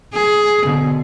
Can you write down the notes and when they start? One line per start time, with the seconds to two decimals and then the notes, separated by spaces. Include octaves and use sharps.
0.14 G#4
0.65 B2 D3